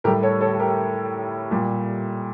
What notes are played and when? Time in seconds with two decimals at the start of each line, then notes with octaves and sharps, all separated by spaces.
0.04 A2 G3 G4 A#4
0.22 A4 C#5
0.41 A4 C#5
0.53 A4
0.59 G4 A#4
1.51 A#2 G3